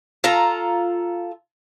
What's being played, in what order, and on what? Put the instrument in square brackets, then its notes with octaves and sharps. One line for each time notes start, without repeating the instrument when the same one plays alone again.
[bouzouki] F4 A4 A#5